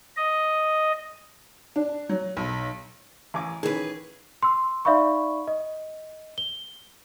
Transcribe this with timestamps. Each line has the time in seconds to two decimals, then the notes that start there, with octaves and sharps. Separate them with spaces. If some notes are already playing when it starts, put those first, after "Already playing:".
0.16 D#5
1.76 D4
2.09 F#3
2.37 B1
3.34 A1 G#5 D6
3.63 D#3 E3 C#4 G#4 B4
4.43 C6 E6
4.85 D#4 D5 E5 F5 B5 C#6
5.47 D#5
6.38 G7